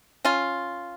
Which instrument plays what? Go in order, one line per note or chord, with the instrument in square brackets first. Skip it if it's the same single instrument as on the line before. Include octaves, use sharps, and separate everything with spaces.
[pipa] C#4 F4